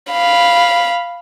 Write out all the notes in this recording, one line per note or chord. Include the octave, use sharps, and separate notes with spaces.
F5 B5